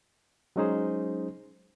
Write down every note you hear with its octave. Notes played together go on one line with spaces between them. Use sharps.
F#3 G#3 C#4 D#4 G#4 C5